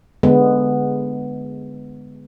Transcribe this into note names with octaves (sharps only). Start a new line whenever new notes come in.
D3 G#3 B3